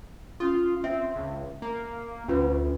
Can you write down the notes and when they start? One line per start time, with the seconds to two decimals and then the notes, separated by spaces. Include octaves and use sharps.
0.40 C#4 F4 D#6
0.84 C4 E5
1.16 C#2
1.62 A#3
2.28 D2 C#4 F4 B4